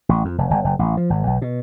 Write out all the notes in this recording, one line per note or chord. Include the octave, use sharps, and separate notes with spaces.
A1
F2
F1
G1
F#1
A1
F3
G#1
B1
B2